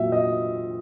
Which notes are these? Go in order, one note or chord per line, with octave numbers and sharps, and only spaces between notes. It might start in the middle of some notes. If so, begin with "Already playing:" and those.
Already playing: A#2 F#3 E5
D#5